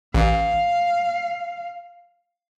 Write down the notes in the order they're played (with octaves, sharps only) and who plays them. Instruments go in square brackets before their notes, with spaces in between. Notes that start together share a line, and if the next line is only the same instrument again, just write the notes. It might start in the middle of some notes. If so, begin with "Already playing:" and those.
[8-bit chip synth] A1 [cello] F5